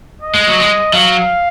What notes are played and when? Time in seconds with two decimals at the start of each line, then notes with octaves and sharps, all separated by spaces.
0.22 D#5
0.34 G#3
0.47 F#3
0.60 G#3
0.93 F#3 F5